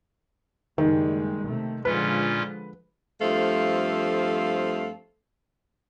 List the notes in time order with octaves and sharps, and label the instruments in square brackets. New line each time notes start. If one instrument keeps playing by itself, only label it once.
[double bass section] F#1 G3 G#3 [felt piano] D#3
[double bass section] C3 A3
[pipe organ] A#2 C#4 F4 [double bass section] D3 F3 G#3 [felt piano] B4
[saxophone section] G2 F3 A3 C4 A4 F5